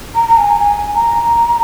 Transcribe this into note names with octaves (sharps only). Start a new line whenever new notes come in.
A#5
A#5
G#5
G#5
A#5